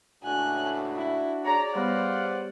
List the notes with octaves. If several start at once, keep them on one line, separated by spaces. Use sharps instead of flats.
C#2 A2 D4 F#4 G#5 F#6
E4
G#4 C#5 D5 A#5
G3 B3 B4 C5 F5 F#5